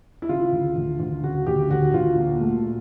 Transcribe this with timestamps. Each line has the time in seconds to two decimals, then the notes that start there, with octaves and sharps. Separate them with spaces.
0.22 E4
0.29 C#3 F4
0.52 D2
0.76 D2
1.00 D2
1.23 C#3 F#4
1.46 D2 G4
1.70 D2 F#4
1.94 D2 F4
2.18 A#2
2.41 A3
2.64 A#2